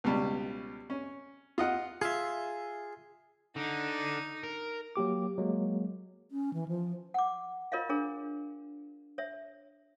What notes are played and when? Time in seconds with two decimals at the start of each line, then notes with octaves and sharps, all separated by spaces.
0.04 C#2 B2 G3
0.90 C#4
1.58 F4 D#5 F#5
2.01 F4 G#4 E5
3.56 D3 D#4
4.43 A#4
4.96 F#3 A#3 G4 D6
5.38 F#3 G#3 A#3
6.32 C#4
6.54 E3
6.68 F3
7.14 F#5 D6
7.72 F4 A#4 C#5 D#5 F5
7.89 D4 G#4 A#4 C#5
9.18 C#5 E5